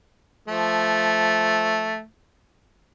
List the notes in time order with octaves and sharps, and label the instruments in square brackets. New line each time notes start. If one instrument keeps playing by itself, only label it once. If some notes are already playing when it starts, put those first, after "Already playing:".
[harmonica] F3 A3